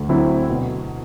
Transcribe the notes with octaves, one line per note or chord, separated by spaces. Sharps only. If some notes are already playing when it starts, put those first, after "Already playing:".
Already playing: D2
D3 F#3 C4 E4
B2